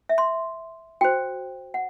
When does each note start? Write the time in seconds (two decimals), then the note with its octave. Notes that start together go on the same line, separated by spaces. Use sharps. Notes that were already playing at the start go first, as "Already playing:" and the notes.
0.09 E5
0.18 C6
1.01 F#4 C5 G5
1.74 F#5